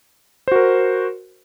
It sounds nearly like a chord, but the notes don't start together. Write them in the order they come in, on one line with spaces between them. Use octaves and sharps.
C5 F#4 A#4